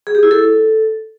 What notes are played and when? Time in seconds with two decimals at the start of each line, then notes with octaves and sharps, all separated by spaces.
0.07 G#4
0.15 G4
0.23 E4
0.31 A4